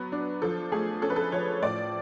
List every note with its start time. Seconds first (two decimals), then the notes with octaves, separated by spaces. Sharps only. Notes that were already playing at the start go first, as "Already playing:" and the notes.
Already playing: F#3 B3
0.12 D4
0.42 F3 A4
0.72 A3 G#4
1.02 C#4 A4
1.10 B4
1.16 A4
1.32 F3 C#5
1.62 A2 D5